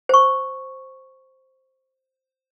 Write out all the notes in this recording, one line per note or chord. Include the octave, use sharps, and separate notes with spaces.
C5 C#6